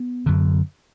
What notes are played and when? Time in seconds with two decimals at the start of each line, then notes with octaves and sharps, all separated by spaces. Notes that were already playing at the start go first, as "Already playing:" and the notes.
Already playing: B3
0.26 F#2 D3